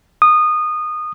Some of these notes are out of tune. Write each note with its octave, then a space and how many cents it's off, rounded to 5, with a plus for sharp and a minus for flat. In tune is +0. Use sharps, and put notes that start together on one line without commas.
D#6 -20